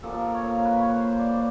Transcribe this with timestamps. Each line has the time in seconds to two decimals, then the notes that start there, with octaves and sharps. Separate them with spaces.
0.03 A#2 F3 A#3 A4
0.19 A#4
0.34 C#5
0.50 A#4
0.65 B4
0.80 C#5
0.96 C5
1.19 D5
1.31 D5